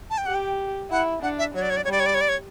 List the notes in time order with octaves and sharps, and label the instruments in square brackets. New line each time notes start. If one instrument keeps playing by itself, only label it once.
[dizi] A5
G5
[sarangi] G4 [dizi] F#5
[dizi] G5
[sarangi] E4 [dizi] F#5
[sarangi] D4 [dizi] F#5
[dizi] E5
[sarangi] F#3 [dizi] C#5
[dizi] D5
C#5
D5
C#5
[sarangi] G3 [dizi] D5
[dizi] C#5
D5
C#5
D5
C#5